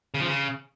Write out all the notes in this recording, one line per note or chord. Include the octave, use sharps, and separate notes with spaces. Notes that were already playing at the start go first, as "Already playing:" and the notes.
C#3
F3
C#3